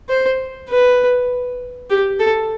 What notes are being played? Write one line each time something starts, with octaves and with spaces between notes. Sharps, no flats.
C5
B4
G4
A4